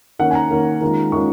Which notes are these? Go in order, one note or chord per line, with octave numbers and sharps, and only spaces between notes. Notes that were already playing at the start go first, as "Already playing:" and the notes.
D#3 A#3 C#4 F#5
G#5
A#5
D#3 A#3 C#4
D#3 G#3 C#4 F4
D#3 G#3 C#4 F4 C#6